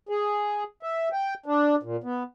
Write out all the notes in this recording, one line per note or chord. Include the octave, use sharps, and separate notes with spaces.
G#4
E5
G5
D4
A#2
B3